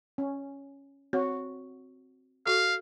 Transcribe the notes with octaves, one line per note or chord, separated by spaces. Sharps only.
C#4
C4 F#4 C#5
F#4 A4 F5